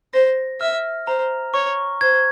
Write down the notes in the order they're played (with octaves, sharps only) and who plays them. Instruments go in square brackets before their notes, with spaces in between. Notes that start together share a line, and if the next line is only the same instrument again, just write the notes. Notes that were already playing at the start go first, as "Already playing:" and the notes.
[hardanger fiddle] C5 [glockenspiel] A#6
[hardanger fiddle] E5 [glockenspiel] F6
[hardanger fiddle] C5 [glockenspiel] A#5
[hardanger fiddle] C#5 [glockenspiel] C#6
[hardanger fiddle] C5 [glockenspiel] G#6